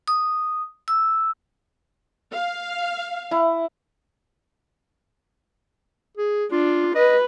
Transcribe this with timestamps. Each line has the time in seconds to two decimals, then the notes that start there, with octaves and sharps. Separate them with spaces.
0.08 D#6
0.88 E6
2.33 F5
3.31 E4
6.17 G#4
6.52 D4 F4
6.95 B4 D#5